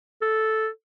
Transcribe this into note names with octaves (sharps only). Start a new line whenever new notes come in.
A4